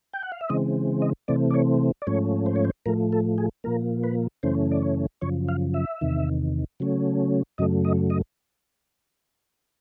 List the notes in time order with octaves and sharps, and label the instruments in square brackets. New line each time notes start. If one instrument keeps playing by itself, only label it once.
[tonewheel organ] G5
F#5
F5
E5
C#3 E3 G#3 C4 D#5
D#5
C3 E3 A3 C4 D5
D5
C#5
D5
G#2 F3 A3 C#4 C#5
C5
C#5
C5
A2 F3 A3 A#4
A4
G#4
A#2 F3 A#3 A#4
B4
F#2 C#3 E3 A3 C#4 C5
D5
C#5
F#2 C#3 F3 C#5
F5
E5
E2 C3 D#3
C#3 F#3 A3 C#4
F#2 C#3 F#3 A3 D#5
D#5
D#5